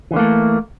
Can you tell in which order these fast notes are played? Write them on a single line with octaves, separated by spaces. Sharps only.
E3 D3 A#3 A3